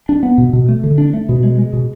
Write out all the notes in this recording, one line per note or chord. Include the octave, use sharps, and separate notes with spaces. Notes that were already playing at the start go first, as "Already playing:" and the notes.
D4
B3
B2
B2
A3
D3
D4
A3
B2
G#3
G#3
B2